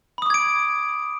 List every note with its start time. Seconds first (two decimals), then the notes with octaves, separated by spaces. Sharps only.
0.18 B5
0.22 D#6
0.26 D6
0.30 G#6
0.34 D7